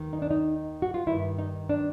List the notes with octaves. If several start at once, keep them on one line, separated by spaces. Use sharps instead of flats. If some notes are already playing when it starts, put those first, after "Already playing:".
Already playing: D#2 D#3
D#4
D4
D#4
F#4
F4
G2 D#3 E4
D#4
D4